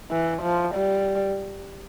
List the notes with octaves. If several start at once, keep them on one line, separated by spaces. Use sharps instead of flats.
E3
F3
G3